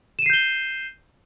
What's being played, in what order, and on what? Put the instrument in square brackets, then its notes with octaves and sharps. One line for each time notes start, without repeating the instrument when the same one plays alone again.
[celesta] E7
D#7
C7
G6
G7